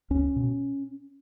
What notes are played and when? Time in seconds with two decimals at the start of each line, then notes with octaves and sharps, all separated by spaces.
0.10 C#2 C#4
0.36 B2